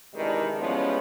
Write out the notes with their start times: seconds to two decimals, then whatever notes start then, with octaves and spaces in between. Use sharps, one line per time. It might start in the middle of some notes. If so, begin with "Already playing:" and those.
0.14 C3 D#3 E3 G3 G#3 D4
0.58 E3 F3 G3 G#3 B3 C#4